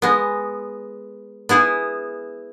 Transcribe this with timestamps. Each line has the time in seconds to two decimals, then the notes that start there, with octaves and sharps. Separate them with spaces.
0.02 G#3 B3
1.49 B3 E4 G#4